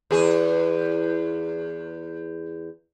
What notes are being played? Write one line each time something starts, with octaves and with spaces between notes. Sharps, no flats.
E2 G#4